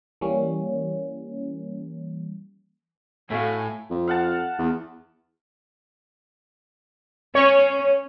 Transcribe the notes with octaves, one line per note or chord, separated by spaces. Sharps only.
E3 G3 A#3 C#4
A2 A3 F#4 F5 G#5
F2
F5 F#5 A5
E2
C#4 C#5